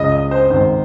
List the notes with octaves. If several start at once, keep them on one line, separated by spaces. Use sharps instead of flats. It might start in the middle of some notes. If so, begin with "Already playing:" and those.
Already playing: C#2 C#3 D#5
D#5
C5
G#1 G#2 D#3 C5